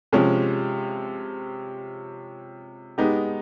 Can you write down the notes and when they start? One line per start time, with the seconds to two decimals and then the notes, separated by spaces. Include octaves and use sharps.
0.13 C3 F3 G#3 C#4
2.98 G#3 B3 D#4 G4